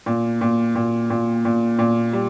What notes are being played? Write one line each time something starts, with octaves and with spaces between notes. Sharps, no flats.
A#2
A#2
A#2
A#2
A#2
A#2
G3